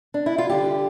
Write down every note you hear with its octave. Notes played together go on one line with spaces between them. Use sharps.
D4
E4
F4
D3 G3 G4